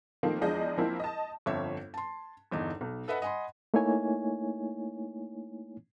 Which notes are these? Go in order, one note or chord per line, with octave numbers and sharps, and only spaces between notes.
D#3 F3 A3 A#3 C4
E2 F3 G#3 D4 D#5 G6
F3 A#3 C4 E4
D#5 A5
G1 F2 C#5 E5
A5 C6
G1 E2 D#4
B1
A4 B4 D#5 E5 F#5 B5
D#5 F#5 G#5 B5 C6
A3 A#3 D#4 E4 C#5 G#5